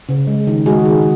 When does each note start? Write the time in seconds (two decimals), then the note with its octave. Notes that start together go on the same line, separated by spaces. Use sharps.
0.09 C#3
0.27 G#3
0.47 D#3
0.66 G#3 F#4 G#4
0.85 D#3